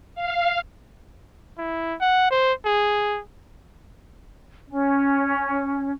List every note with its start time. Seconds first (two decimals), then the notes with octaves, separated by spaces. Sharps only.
0.15 F5
1.58 E4
2.01 F#5
2.31 C5
2.65 G#4
4.69 C#4